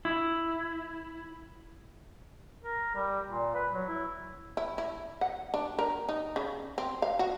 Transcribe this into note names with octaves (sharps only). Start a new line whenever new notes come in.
E4
A#4
G3
A#2
B4
F#3
E4
E4
E4
F#5
D4
A#4
D#4
C#3
C4
F5
F#4